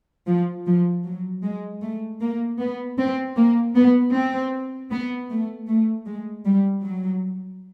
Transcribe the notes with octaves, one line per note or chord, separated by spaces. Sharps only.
F3
F3
F#3
G#3
A3
A#3
B3
C4
A#3
B3
C4
B3
A3
A3
G#3
G3
F#3